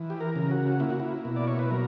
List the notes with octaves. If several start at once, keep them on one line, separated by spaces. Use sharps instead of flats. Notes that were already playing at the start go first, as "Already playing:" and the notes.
Already playing: E3
G4
A#4
C#3
F#4
A#3 E4
F#4
E4
B2
D5
C#5
B4
F#3 A#4